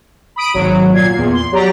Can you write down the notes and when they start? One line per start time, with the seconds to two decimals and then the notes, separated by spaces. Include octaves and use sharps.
0.36 B5 D#6 D7
0.54 G#1 F#3
0.93 A#2 G#6 C7
1.14 E2 A#2
1.33 C6
1.52 F#3 G4 D5 A#5